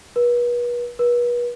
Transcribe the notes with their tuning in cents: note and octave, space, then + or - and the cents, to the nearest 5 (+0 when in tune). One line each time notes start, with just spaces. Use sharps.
B4 -40
B4 -40